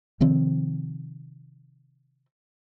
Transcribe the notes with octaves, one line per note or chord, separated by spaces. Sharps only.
C3 D#3 F3 C4